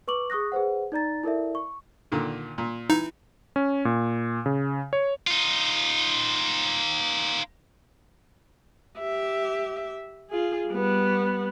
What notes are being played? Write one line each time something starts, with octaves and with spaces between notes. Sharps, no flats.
B4 C#6 D6 F#7
G#4 C#6 D#6 F#6 A#6
G#4 B4 C5 F#5
D#4 D5 A#5 A6
E4 A4 A#4 D5 E5
C#6
A#2 D3 D#3
A#2
E3 D#4
C#4
A#2
C#3
C#5
D#4 F4
G4 E5
F4 G#4
G3 B3